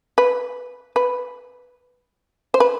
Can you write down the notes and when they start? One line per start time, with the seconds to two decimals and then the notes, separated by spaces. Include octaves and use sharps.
0.18 B4
0.96 B4
2.54 C5
2.60 B4